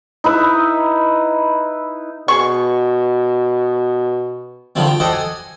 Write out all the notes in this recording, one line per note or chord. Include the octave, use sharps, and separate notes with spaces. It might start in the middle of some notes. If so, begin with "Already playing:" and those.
D#4 E4 B4 E5
B2 G#4 C#6
D3 D#3 F3 G3 C4
G5
G4 A4 C5 D#5 F#5
G#5